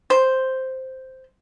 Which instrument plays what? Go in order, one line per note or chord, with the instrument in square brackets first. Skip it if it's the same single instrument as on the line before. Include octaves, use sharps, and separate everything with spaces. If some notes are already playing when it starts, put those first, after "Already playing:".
[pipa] C5